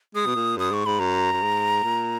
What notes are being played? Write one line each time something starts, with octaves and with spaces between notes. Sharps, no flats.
G#3 D#6
B2
A#2
F#2 D#6
G#2 C#6
G#2 B5
F#2 A#5
F#2
G#2
A#2